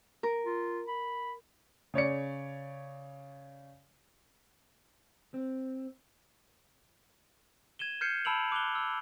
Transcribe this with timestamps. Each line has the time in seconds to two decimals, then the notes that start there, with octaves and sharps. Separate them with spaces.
0.23 A#4
0.45 F4
0.88 B5
1.94 C#3 C#5 D5 C#7
5.34 C4
7.79 G#6 D#7 E7 G7
8.01 F6 G6 G#6 C7 C#7 D#7
8.25 A5 B5 E6 D7 F7 F#7
8.52 D6 F#6 F7 G7
8.75 E6